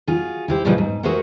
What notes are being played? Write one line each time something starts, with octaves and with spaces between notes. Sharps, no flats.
F4 F#4 G#4
E4 G4 C5
G2 A#2 C#3 F3 G3 G#3
G#2
F#4 G#4 A#4 C5 E5 F#5